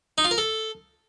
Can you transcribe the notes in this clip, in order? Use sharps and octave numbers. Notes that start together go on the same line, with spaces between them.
D#4
F4
A#4
A4